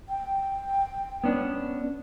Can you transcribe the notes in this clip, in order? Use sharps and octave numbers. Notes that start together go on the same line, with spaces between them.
G5
B3 C#4 D4